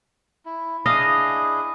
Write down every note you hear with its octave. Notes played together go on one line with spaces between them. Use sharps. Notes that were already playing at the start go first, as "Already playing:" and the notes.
E4
D4 E4 G#4 D#5 F5